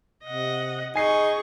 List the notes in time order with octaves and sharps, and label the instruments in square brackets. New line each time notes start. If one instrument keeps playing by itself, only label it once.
[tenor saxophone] C3 [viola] D#5 F#5
[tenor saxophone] D#4 [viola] G#4 C#6 [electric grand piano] G#5 C7